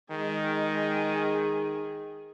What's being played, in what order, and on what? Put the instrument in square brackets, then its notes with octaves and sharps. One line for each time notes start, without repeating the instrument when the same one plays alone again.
[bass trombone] D#3 [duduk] G#3 [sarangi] G#4